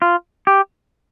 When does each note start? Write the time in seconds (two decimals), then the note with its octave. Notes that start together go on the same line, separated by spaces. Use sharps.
0.02 F4
0.47 G4